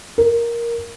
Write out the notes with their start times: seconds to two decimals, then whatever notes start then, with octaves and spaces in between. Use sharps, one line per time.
0.18 A#4